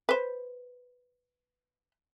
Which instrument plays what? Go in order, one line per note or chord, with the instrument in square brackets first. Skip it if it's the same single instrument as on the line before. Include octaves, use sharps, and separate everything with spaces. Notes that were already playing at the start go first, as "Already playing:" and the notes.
[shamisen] B4 C5